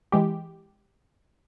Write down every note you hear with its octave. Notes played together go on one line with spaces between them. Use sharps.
E3 G#3 G4